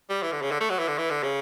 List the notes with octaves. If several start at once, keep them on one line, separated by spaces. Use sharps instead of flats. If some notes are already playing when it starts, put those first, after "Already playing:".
G3
E3
D3
C#3
D3
A3
F#3
E3
D3
E3
D3
C#3